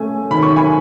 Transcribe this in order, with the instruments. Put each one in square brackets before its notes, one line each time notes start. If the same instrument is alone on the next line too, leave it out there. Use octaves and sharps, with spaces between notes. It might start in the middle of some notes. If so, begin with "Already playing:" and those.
Already playing: [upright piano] A3 C#4 G#5
D#3 B5
C#6
G#5 B5